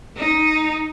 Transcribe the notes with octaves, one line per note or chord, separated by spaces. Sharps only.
D#4